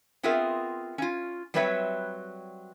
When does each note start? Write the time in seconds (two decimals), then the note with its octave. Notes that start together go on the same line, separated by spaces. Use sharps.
0.23 B3 C4 F4 G#4 A#4 E5
0.98 C#4 F4
1.54 F#3 G3 C4 B4 C#5 E5